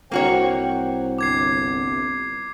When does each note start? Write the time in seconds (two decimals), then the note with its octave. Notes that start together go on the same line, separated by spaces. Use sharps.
0.11 C2 A#3 F#4 C5 C#5 G5
1.19 G1 D6 G#6 C7